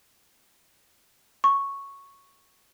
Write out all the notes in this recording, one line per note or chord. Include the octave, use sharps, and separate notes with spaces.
C#6